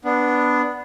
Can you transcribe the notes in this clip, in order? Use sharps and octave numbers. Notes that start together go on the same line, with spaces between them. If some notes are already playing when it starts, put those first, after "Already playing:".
B3 D4